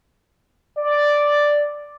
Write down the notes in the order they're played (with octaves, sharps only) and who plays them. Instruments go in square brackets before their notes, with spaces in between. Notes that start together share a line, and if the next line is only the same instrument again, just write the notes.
[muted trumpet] D5